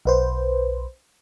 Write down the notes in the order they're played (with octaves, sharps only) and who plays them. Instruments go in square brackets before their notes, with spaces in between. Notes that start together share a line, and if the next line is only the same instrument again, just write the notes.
[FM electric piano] B1 B4 C5